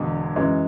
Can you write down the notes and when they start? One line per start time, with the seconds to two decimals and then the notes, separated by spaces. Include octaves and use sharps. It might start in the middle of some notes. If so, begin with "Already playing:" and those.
Already playing: E1 E2 D3 G#3
0.36 F#2 E3 G#3